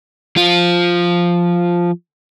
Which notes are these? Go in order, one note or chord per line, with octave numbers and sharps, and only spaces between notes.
F3 F4